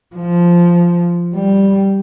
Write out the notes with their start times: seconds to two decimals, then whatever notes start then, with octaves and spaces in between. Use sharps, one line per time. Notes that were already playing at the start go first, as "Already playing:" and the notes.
0.16 F3
1.35 G3